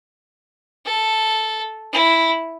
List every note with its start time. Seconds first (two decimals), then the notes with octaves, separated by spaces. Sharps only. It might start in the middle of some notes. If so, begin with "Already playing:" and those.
0.85 A4
1.93 E4